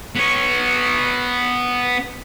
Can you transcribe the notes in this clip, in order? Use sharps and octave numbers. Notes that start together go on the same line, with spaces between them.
B3 C#5